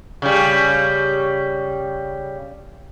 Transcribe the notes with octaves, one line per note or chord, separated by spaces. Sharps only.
C#3 G3